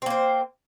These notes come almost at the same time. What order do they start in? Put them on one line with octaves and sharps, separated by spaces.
C4 A#3 C5